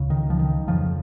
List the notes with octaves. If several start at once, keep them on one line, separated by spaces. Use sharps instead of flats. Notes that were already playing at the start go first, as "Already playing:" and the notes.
Already playing: C#2 C#3
D#3
F3
D#3
F2 C#3 F3